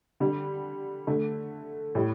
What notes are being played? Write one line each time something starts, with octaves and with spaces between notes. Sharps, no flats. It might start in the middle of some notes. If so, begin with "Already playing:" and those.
D3 G3
D3 A3
A2 G3